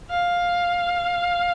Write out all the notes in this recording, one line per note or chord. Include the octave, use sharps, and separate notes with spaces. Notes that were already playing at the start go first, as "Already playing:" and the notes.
F5